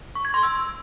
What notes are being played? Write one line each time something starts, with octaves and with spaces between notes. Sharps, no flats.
C#6
G#6
C6
E6